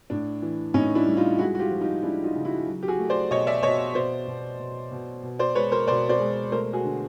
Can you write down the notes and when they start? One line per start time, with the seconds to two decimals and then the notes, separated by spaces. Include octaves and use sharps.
0.10 A2 D4
0.42 E3
0.74 A2 C#4 D#4
0.95 D4 E4
1.06 G3
1.17 D#4 F4
1.39 G#3 E4 F#4
1.55 F#4
1.59 F4 G4
1.70 F3 F#4
1.81 D#4 F4
2.03 G#3 D4 E4
2.24 D#4 F4
2.35 C#3
2.45 E4 F#4
2.67 F#3
2.83 G4
2.88 F#4 G#4
2.99 A3
3.10 C5 D5
3.31 B2 C#5 D#5
3.47 D5 E5
3.63 B2 C#5 D#5
3.95 B2 C5 D5
4.28 B2
4.59 B2
4.91 B2
5.23 B2
5.39 C5 D5
5.55 G#3 B4 C#5
5.71 A#4 C5
5.87 B2 C5 D5
6.09 C5 D5
6.20 G#3
6.52 A3 A#4 C5
6.73 F#4 G#4
6.84 D3